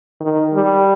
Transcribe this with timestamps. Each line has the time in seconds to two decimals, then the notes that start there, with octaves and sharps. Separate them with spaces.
0.21 D#3
0.54 G3